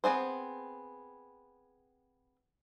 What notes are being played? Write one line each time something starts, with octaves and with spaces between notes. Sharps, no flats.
B3 C4 G#4 C5